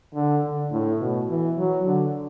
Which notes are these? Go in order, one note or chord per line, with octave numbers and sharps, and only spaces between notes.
D3
D3
A2
B2
E3
F#3
D3